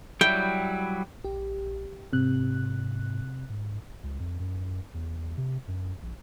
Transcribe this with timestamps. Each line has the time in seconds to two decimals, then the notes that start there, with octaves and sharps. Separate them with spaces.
0.21 F#3 G3 E4 G5
1.24 A#1 G4
2.13 G#2 C3 F#6
3.50 G#2
4.03 C#2
4.20 F2
4.39 F#2
4.94 E2
5.37 C3
5.68 F#2
6.02 A#1